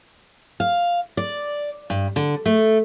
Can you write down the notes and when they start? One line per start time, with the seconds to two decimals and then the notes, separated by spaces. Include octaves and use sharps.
0.60 F5
1.17 D5
1.90 G2
2.16 D3
2.46 A3